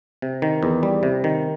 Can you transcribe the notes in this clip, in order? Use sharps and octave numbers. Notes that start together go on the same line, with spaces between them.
C3
D#3
E2
G3
C3
D#3